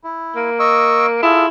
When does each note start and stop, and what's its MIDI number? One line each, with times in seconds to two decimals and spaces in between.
0.04 0.50 64
0.36 1.19 58
0.59 1.06 75
0.59 1.06 85
0.59 1.06 88
1.23 1.49 64
1.23 1.46 65
1.23 1.46 68
1.23 1.46 69